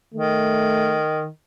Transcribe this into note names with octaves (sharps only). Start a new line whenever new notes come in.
D#3 A3